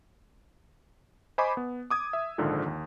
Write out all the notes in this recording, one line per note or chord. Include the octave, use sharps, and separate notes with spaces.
C5 D#5 G#5 B5 C#6 D6
B3
D6 D#6 G#6
E5
A#1 G#2 D3 D#3 F3
D#2